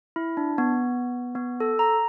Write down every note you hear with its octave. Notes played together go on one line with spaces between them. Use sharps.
E4
D4
B3
B3
A4
A#5